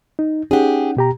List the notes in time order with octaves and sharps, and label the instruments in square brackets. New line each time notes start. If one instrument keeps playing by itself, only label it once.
[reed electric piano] D#4
[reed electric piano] C#4 D#4 F#5 [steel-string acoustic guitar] G4 G#4
[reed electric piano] B2 G4 A#5